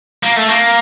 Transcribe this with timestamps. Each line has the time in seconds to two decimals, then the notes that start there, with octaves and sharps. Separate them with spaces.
0.23 A#3
0.36 A3
0.49 A#3